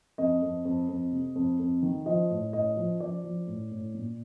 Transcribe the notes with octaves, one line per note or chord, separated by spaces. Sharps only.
F2 D#5
F2
F2
F2
C3
F2
F2
D#3
F3 D#5
A2
A2 D#5
F3
F3 D5
F3
A2
A2
A#2